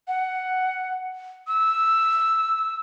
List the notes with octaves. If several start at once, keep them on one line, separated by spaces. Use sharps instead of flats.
F#5
E6